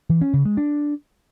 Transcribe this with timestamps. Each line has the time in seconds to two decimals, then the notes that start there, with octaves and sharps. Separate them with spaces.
0.09 E3
0.21 C#4
0.33 C#3
0.45 G#3
0.57 D4